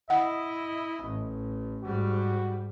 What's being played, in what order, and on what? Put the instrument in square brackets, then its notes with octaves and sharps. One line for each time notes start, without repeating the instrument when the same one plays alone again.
[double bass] E4 [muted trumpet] D#5 [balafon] F#5
[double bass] A1
[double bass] G#2 G3 [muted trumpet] F#4